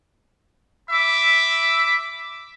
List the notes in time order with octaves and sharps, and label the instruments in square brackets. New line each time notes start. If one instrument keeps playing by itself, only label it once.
[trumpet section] E5 B5 D6